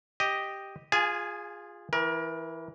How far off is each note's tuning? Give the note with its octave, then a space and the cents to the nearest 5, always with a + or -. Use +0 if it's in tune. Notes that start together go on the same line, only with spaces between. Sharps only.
G4 +0 D#5 +0
F4 +0 G#4 -15 G#5 +20
E3 +0 A#4 +30